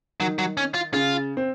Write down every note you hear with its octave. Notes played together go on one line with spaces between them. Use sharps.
D#3 F#3
F#3
C#4
F4
C#3 F4
C4